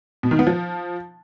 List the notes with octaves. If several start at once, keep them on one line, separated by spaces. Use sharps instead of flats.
B2
D#3
B3
F3